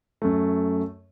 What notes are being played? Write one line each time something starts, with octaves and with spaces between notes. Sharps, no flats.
F#2 A3